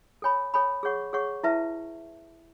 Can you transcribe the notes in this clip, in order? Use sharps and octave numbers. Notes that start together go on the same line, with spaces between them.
A4 C#5 G#5 B5
A4 C#5 G#5 B5
G#4 C#5 F#5 C#6
G#4 C#5 F#5 C#6
E4 B4 E5 A5